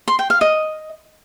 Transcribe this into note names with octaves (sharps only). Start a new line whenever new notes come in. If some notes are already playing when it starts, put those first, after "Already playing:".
C6
G5
F5
D#5